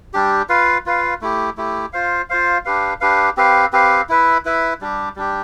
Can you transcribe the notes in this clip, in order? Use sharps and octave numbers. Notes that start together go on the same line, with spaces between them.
G3 D4 G4
F4 B4 F5
F4 B4 F5
A3 E4 G4
A3 E4 G4
F4 C5 F5
F4 C5 F5
D4 G4 B4 F5
D4 G4 B4 F5
C4 G4 B4 F5
C4 G4 B4 F5
E4 B4 E5
E4 B4 E5
G3 D4 G4
G3 D4 G4